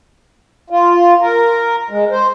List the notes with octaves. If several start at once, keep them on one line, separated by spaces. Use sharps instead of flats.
F4
A#4
G#3
C5